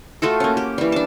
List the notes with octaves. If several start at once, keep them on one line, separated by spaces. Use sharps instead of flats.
A3 F4 F#4 A4
A#3 C#4
G4
E3 G3
D4 A5